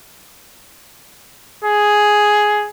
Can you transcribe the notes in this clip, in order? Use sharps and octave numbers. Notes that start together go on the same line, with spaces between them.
G#4